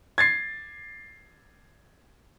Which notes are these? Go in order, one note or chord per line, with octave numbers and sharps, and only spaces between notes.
G#6 A6 C7